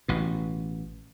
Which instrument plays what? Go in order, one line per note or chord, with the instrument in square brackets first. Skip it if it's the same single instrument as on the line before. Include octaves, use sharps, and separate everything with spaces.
[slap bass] A1 B2